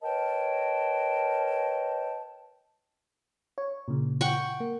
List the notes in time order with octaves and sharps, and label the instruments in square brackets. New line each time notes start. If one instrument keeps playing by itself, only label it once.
[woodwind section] A#4 B4 C#5 D#5 G5 A5
[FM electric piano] C#5
A#2 C#3
[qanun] F#5 G5 C#6
[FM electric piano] A#3